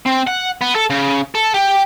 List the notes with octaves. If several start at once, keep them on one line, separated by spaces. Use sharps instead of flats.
C4
F#5
B3
A4
C#3
A4
G4